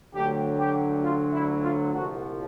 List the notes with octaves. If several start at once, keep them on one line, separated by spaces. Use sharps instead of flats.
D2 D3 F#3 G4
G4
F4
E4
F4
C2 A#2 F3 F#4